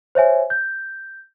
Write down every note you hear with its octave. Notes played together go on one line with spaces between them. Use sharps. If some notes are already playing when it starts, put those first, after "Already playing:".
C5 C#5 E5 G#5
G6